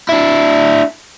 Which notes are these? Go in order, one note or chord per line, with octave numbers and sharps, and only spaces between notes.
D4 E4